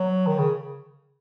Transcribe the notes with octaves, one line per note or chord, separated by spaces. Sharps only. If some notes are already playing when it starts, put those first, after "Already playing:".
Already playing: F#3
D#3
C#3